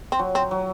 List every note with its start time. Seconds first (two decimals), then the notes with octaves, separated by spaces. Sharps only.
0.12 C4
0.19 F#3
0.35 C4
0.51 F#3